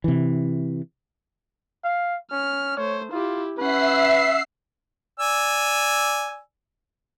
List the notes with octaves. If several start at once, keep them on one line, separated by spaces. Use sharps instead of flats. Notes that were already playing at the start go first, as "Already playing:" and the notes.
C3 E3
F5
C#4 F6
A3 C5 C#5
E4 F4 G4
C#4 B4 E5 F#5 C7
D5 G#5 E6